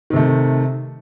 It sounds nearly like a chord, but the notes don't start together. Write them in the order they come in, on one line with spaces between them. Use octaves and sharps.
D#3 C3 A3